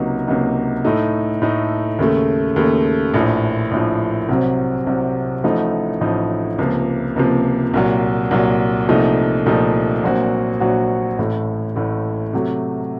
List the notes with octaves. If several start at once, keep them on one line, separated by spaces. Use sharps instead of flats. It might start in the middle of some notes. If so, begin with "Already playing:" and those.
Already playing: C#2 C3 F#3 A#3 D#4
C#2 C3 F#3 A#3 D#4
A2 A3 D#4 A4
A2 A3 D#4 A4
D#2 C#3 A3
D#2 C#3 A3
A#1 A2 F3
A#1 A2 F3
C2 C3 F#3 C4
C2 C3 F#3 C4
A1 A2 F3 A3 D#4
A1 A2 F3 A3 D#4
C#2 C3 F3 A#3
C#2 C3 F3 A#3
C2 A#2 F#3
C2 A#2 F#3
C2 A#2 F3 A3 D#4
C2 A#2 F3 A3 D#4
A#1 A#2 F#3 C4 F#4
A#1 A#2 F#3 C4 F#4
A1 A2 A3
A1 A2 A3
C3 F#3 A3